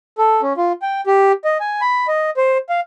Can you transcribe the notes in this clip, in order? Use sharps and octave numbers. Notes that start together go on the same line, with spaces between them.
A4
C#4
F4
G5
G4
D#5
G#5
B5
D#5
C5
F5